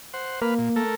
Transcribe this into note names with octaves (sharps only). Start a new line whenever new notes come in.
C5 F#5
A#3 B4 F6
A#2
A3 A4 A#4